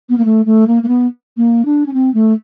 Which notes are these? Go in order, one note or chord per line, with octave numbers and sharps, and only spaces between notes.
B3
A#3
A3
A3
A#3
A#3
B3
A#3
D4
C#4
C4
A3